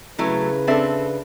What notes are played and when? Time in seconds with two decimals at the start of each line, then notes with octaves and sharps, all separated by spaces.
0.19 C#3 F#3 A3 C#4 E4 B4
0.67 C4 D4 A4 D5 E5